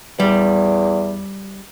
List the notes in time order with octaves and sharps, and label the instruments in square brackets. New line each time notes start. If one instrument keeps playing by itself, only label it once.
[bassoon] E2 [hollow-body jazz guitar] G3